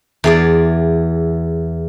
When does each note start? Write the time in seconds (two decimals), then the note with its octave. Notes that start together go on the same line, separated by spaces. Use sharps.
0.24 E2 G#4 D5